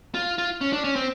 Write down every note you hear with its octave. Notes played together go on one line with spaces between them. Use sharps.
F4
F4
C#4
D4
C#4
C4